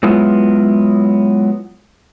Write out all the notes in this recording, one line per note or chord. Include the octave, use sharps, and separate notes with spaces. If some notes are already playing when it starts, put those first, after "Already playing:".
F#3 G#3 B3 E4 F4